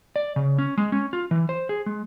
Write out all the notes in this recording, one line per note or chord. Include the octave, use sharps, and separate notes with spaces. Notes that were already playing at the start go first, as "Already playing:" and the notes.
D5
C#3
C#4
G#3
C#4
F4
E3
C5
G#4
G#3